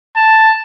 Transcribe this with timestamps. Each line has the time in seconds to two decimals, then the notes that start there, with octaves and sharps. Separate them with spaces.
0.16 A5